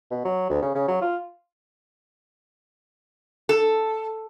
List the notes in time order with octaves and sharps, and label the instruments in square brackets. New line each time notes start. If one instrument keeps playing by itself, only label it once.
[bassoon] B2
F#3
D2
C#3
C#3
F#3
F4
[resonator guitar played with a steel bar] A4